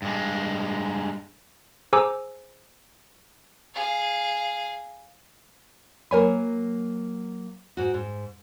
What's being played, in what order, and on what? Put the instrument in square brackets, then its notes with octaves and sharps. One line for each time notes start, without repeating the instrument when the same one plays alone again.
[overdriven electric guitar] G2 G#3
[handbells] G#4 C5 G#5 A#5 D6 E6
[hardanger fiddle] G#4 F5
[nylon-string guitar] F#3 A#3 G#5 [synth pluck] A#4 C#5 B5
[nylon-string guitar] G#2 F#4
G#2